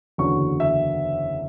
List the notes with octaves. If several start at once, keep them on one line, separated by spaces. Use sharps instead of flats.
F#1 E2 D3 F#3 C#4 C#6
E5